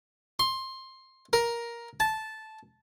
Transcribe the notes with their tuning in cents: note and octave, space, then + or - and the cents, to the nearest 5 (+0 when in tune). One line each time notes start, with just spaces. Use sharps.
C6 +15
A#4 +10
A5 -10